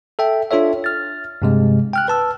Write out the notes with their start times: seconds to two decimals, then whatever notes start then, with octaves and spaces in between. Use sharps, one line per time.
0.19 A4 E5 G5
0.51 D4 F4 A4 C#5 E5
0.84 F6 A6
1.42 G2 C3 G#3
1.93 G5 F6 F#6
2.08 B4 A5 E6